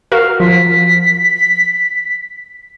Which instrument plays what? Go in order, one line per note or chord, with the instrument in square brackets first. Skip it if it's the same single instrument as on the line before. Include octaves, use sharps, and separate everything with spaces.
[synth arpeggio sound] F#4 A#4 [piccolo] F5
[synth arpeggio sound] F3 [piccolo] B6